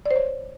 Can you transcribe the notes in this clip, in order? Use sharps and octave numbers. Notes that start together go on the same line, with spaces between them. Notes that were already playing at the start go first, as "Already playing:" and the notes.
D5
C5
C#5